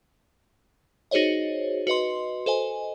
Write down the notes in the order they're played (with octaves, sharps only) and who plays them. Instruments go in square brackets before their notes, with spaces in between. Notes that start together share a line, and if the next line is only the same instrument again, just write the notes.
[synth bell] D#4 F#4 G#4 C5 C#5 D#5
F#4 B4 D#5 C6
A4 C5 D#5 G#5